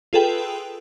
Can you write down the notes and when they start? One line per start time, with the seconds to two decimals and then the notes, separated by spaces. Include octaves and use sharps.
0.13 F4 G#4 A4 B4 G5